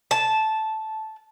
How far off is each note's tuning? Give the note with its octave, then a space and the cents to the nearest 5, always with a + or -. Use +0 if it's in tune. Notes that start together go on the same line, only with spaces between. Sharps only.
A5 -10